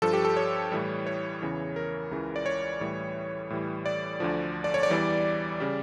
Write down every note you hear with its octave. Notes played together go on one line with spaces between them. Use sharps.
G2 F3 A4
G4
A4
C#5
A2 E3 G3
C#5
E2 C#3 E3
A#4
C#2 C#3 E3
D5
C#5
A2 E3 G3
A2 E3 G3
D5
D2 D3 F3
D5
C#5
D5
E2 E3 G3
C#3 G3